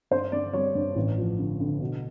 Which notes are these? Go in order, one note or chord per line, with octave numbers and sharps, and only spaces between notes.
G2 C5
G2 D5
G3 C#5
G2
A1
F3
D3
D3
B2